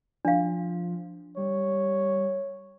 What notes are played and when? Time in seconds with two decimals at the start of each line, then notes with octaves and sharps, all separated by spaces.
0.25 F3 D4 F5
1.37 G3 C#5